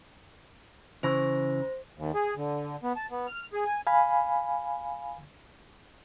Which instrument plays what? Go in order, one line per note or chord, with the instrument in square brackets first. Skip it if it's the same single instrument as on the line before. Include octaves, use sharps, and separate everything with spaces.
[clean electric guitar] C#3 E3 [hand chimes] C5 A#6
[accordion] D#2
G#4
D3
B3
A5
B3
F6
G#4
G#5
[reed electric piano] F5 G#5 B5